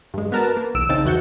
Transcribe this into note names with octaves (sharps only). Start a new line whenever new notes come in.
G2 G#3
B3 F#4 A#4 B4 A5
A#3
B1 E2 E6 D7
C#3 C4 D#4 A5
E2 E3 F#4 G6 C#7